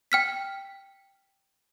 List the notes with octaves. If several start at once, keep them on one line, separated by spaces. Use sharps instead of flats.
G5 F6 B6